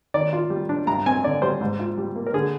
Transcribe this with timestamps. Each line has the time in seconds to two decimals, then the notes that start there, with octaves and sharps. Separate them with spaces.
0.14 D#3 D5
0.33 F4
0.50 G3
0.69 D4
0.87 G2 A#5
1.06 C4 G#5
1.24 D3 D5
1.42 G3 C5
1.61 G#2
1.79 F4
1.97 G3
2.16 A#3
2.27 A#4
2.34 D3 G#4